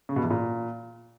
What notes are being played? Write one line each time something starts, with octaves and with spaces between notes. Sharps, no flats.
C#3
B2
E2
A#2